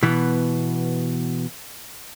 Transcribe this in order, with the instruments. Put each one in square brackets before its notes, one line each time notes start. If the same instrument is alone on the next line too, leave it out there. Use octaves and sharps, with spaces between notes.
[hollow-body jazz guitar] B2 E3 B3